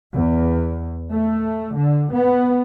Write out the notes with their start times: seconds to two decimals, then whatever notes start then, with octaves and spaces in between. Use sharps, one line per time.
0.13 E2
1.13 A3
1.75 D3
2.13 B3